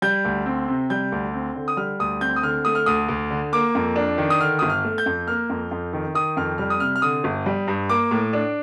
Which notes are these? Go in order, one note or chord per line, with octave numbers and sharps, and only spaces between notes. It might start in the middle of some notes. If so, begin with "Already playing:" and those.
G3 G6
D2
C4
C3
G3 G6
D2
C4
D3
D#6
G3 F6
D2 D#6
C4 G6
D#6
D3 F6
A3 D#6
F6
D2 D#6
D2
D3
A#3 D6
F2
D4
D#3
D#6
D3 F6
G1 D#6
F6
A3
G6
F2
A#3 F6
F2
F2
D#3
D#3 D#6
F2 F6
G3 F6
D#6
C3 F6
F6
D3 D#6
G1
G3
G2
A#3 D6
A2
D4